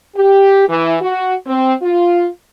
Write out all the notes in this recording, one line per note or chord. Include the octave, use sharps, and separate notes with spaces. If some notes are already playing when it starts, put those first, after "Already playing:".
G4
E3
F#4
C4
F4